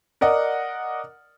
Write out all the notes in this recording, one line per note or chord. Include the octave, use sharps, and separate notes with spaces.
A#4 D5 D#5 F#5